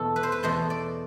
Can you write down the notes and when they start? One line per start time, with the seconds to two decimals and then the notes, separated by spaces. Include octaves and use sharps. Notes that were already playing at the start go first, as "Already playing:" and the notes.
Already playing: E2 B2 A3 A4
0.16 B4
0.23 C5
0.32 B4
0.43 E2 B2 A3 C5
0.70 D5